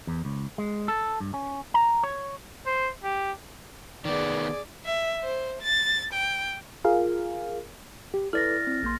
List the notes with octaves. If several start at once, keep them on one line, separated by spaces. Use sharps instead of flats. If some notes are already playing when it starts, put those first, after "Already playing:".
E2
C#2
G#3
A4
G2
C#4
A#5
C#5
C5
G4
D#3 B3 G#4 D5
E5
C5
A6
G5
F4 G#4 A#4 F5
G4
E4 A4 B4 D5 F6 A6 A#6
C4
A#1 A#3 C6